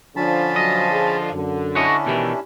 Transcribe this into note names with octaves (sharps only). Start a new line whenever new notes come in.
D3 F3 C#4 D4 A5 B5
F#3 D#5
G#4
F#2 D3
C#4 D4 E4 F#4 C#5 D#5
B2 D#3 E3 G4